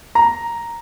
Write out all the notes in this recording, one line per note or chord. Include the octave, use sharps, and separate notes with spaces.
A#5